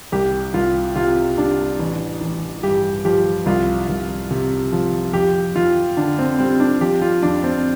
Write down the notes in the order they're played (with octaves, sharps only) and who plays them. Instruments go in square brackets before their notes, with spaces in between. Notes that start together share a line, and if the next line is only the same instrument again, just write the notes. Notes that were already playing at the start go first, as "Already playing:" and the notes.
[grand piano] C2 G4
C2 F4
C3 F4
G3 D4
A1
A1
G2 G4
F3 G4
C2 F4
C2
C3
F3
F2 G4
F2 F4
D3 D4
C4
G3 C4
D4
F3 G4
F4
F2 D4
C4